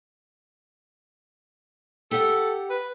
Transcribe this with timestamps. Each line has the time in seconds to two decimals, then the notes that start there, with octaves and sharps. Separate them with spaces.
2.11 G4 A4 F#5
2.70 B4